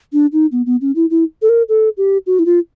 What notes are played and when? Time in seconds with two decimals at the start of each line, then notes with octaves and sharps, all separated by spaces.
0.13 D4
0.33 D#4
0.52 B3
0.66 B3
0.81 C#4
0.96 E4
1.10 E4
1.42 A4
1.49 A#4
1.69 A4
1.97 G4
2.27 F#4
2.39 E4
2.46 F4